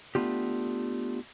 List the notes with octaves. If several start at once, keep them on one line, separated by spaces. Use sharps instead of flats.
A3 B3 D4 F4 G4